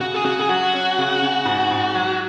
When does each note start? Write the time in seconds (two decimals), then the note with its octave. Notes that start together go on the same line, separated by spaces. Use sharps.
0.01 C#3 F#4
0.14 G#4
0.25 C#3 F#4
0.39 G#4
0.49 F#3 F#4
0.73 C#4
0.98 C#3
1.22 C#3
1.45 G#2
1.71 G#2
1.95 F#3